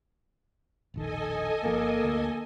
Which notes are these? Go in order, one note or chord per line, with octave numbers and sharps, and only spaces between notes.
E1 A#1 D#3 A4 D#5 G#5
G1 A#2 F3 A#3
D2